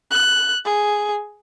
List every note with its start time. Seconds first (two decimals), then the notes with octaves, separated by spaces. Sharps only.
0.11 F#6
0.65 G#4